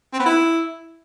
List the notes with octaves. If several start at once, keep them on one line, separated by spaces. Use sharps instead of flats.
C4
B3
E4